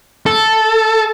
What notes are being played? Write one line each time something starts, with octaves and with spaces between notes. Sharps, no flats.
A4